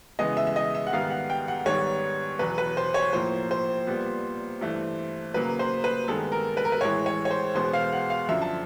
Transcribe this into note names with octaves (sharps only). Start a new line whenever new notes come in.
C#3 E3 G#3 B3 D#5
E5
E5
D#5
E5
F#5
G#2 D#3 G3 B3 F5
F#5
G5
F#5
G#2 D#3 G3 B3 C#5
E2 B2 F#3 B4
B4
C5
C#5
A2 F3 A#3 C5
C5
A#2 G3 B3
G2 E3 A3
C#3 F#3 A#3 B4
C5
B4
G2 D#3 G#3 B3 A4
A#4
B4
A#4
B4
A2 E3 G#3 C#5
C#5
C#5
C5
E2 B2 G#3 B3 C5
F5
F#5
F5
F#2 D3 F3 E5
A5